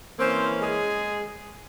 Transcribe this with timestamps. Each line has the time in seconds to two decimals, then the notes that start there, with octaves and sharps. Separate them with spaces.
0.19 E3 A#3 C4 C#4 C5
0.61 G#3 G#4